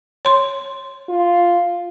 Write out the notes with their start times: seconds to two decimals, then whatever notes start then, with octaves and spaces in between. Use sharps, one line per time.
0.25 C#5 C6
1.09 F4